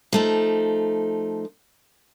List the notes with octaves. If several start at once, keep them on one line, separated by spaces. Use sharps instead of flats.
F3 A3 D#4